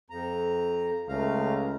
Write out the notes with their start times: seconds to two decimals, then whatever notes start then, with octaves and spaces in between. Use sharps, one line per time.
0.10 F2 A#5
1.09 C#2 A3 F5 A#5